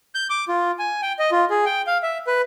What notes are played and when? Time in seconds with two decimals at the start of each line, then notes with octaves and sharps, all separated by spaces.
0.15 G6
0.30 D6
0.48 F4
0.79 G#5
1.02 G5
1.19 D#5
1.32 F4
1.50 G#4
1.66 G5
1.87 F5
2.03 E5
2.27 B4